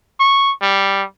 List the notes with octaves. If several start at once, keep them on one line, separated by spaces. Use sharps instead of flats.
C#6
G3